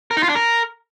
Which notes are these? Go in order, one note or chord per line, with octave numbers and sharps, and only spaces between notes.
A#4
D#4
F4
D4
A#4